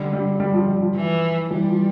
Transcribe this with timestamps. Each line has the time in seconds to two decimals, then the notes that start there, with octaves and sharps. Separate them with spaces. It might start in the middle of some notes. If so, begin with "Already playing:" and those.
Already playing: D3 G3
0.13 G3
0.40 G3
0.54 F3
0.67 G3
0.82 F3
0.95 E3
1.50 E3 G3
1.70 F3